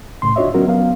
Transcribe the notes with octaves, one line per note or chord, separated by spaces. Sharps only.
C2 A2 C#3 C6
D4 F4 F#4 C#5 D#5 E5
F#3 B3 C#4 F#4 A#4
F#3 B3 F5